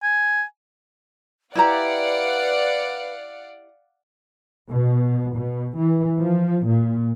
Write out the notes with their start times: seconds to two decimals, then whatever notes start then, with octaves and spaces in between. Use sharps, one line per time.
0.03 G#5
1.55 E4 G4 B4 D5 F5 F#5 A#5
4.69 B2
5.35 B2
5.78 E3
6.17 F3
6.66 A#2